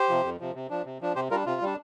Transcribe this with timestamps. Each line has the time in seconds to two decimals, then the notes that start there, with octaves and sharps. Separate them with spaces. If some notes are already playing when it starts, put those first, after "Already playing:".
Already playing: G4 C5
0.09 C3 F3
0.24 F2
0.40 C3 F3
0.55 C3
0.70 F3 D4
0.85 C3
1.01 F3 D4
1.15 C3 G4 C5
1.31 G3 D4 F4 A#4
1.46 C3 F4
1.61 G3 D4